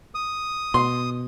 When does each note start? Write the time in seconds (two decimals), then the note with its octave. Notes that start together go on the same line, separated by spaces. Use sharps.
0.15 D#6
0.74 B2 C6